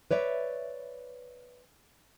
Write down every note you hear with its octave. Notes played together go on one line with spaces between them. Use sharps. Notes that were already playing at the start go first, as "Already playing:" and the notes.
B4 C#5 D5 E5